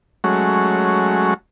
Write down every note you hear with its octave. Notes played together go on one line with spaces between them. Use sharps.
F#3 G#3 A3 C#4 F#4